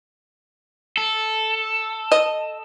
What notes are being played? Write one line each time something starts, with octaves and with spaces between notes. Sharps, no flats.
A4
D#5